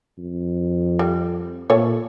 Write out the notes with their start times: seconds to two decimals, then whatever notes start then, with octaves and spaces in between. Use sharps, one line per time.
0.18 F2
0.99 G3
1.70 A#2 A3 C#5